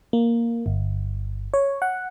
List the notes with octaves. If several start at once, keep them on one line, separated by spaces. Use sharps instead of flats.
A#3
G1
C#5
F#5